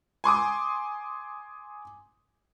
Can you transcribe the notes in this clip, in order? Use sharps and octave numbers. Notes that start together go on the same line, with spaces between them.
G#5 C6 D6 D#6